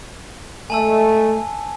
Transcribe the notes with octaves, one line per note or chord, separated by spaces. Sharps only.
G#3 A3 G#5 A5 E6